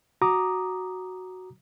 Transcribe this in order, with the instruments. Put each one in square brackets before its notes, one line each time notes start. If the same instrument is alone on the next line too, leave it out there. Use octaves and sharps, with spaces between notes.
[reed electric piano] F#4 A#5 D6 D#6